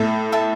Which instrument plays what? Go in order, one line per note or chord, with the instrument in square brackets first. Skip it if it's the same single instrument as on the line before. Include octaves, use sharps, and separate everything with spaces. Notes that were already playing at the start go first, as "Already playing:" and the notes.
Already playing: [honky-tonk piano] A2 [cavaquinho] A4 E5 A5
[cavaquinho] A4 E5 A5